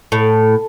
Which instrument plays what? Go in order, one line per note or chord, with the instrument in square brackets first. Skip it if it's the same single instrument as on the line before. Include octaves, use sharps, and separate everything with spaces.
[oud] A2